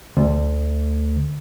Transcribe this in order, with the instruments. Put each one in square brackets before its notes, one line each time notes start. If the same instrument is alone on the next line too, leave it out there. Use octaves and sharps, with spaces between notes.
[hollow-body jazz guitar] D2